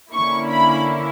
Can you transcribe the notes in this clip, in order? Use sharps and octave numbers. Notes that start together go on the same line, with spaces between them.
D3 A#3 C#4 E4 C#6
B5